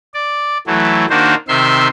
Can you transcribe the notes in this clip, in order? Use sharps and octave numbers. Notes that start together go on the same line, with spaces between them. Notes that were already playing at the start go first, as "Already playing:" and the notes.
D5
E3 F#3 A3
D#3 A#3 D4 D#4 F#4 C5
C3 D#3 E5 C6